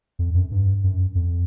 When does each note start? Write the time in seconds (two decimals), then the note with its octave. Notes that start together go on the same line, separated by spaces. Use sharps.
0.19 F2
0.34 F#2
0.51 G2
0.84 F#2
1.15 F2